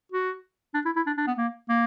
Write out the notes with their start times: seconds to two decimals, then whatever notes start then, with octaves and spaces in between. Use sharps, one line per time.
0.12 F#4
0.74 D4
0.86 E4
0.96 E4
1.07 D4
1.17 D4
1.27 B3
1.37 A#3
1.69 A#3